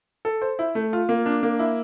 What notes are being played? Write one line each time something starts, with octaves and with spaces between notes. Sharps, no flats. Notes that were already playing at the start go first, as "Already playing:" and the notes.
A4
C5
E4
A3
F4
A#3
D4
A#3
E4